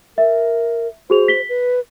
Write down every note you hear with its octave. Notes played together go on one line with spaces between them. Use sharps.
A#4 E5
F#4 G#4 C5 F7
B6 G7
B4